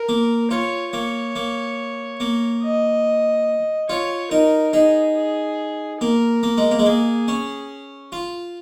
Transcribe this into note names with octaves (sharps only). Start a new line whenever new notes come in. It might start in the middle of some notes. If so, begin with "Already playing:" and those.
Already playing: A#4
A#3
F4 C#5
A#3 C#5
A#3
A#3
D#5
F4 C#5
D#4 A#4
D#4 G#4
G#4
A#3 A#4
A#3
G#3
A#3
G#3
A#3 G#4
C#4
F4